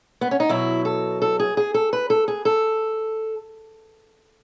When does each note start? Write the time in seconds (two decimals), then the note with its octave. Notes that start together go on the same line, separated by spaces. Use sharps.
0.21 B3
0.31 C#4
0.40 D#4
0.49 B2 F#3 E4
0.85 A4
1.22 A4
1.40 G#4
1.57 G#4
1.74 A4
1.93 B4
2.10 A4
2.28 G#4
2.45 A4